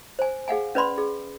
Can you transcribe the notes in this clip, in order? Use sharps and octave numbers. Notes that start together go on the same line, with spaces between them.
C5 G#5
G#4 F5 F#5 G#5
C#4 B4 D5 B5 C6
G#4